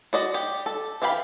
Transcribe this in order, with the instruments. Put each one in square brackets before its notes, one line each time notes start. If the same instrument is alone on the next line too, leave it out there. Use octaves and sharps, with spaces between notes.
[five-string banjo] F#4 D5 D#5
G4
A4
E3 G4 F5 G5 B5